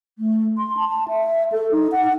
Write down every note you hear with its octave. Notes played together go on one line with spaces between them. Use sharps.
A3
C6
A5
E5
A4
D#4
F#5